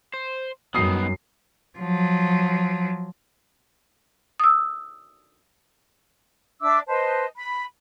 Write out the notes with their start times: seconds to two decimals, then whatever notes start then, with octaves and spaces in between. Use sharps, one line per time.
0.14 C5
0.74 F#2 G3 B3 D#4 F#4 D#6 C7
1.79 F3 F#3
4.40 D#6 E6
6.61 D4 E5 D6 E6
6.87 B4 C5 D#5 A5
7.35 B5